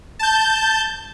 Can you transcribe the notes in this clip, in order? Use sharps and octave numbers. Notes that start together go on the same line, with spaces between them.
A5 G6